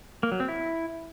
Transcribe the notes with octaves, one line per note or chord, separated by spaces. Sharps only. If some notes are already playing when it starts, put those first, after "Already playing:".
A#3
F#3
C4
E4